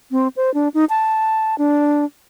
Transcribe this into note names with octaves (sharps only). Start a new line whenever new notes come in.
C4
C5
D4
D#4
A5
D4